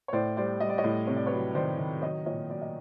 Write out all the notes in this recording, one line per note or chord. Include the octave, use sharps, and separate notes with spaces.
C#5
A2 C5 D5
G3 C5 D5
G3 D#5
D5
C#5 D#5
A2
C3 C#5
D5
F#3 B4 C#5
D#3 C5 D5
D#3
F#3 C#5 D#5
A#2 C#5 D#5
F#3 D5
D#5